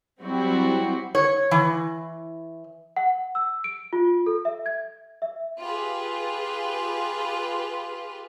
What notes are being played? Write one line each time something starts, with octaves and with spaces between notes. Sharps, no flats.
F#3 G3 C4 E4 F#4
C#5
E3
F#5
E6
D7
F4
A4
E5
G#6
E5
F4 G4 G#4 B4